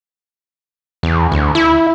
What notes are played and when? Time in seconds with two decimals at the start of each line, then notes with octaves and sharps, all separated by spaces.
1.03 E2
1.32 D2
1.55 E4